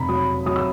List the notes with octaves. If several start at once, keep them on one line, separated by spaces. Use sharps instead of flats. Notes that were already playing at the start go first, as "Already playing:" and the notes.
Already playing: F1 A#5 B5
F#3 D#6
F#3 D#6
E6